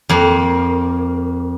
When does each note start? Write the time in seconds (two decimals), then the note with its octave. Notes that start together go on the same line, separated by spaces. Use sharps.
0.09 F2 A#3